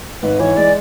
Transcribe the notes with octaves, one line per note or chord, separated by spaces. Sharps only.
G#1 B4
E3 C#5
G#3 D5